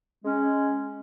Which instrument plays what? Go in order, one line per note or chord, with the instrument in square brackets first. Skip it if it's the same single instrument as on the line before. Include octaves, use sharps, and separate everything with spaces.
[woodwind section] G#3 C#4